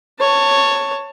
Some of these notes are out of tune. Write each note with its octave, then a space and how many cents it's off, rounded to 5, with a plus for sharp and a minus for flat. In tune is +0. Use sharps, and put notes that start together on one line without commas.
C#5 +0 A5 +20